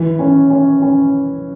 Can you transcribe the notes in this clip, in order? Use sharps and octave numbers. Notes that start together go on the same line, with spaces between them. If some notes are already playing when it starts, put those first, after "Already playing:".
Already playing: E3
C#4
C#4
C#4